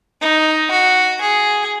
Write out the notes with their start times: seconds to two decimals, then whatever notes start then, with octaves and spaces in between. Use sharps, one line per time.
0.21 D#4
0.71 F#4
1.21 G#4